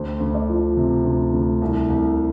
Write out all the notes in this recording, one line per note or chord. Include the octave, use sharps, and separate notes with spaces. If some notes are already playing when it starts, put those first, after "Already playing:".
Already playing: D2 C5
D2
D5
F3
C3
D2
D2
C2
C2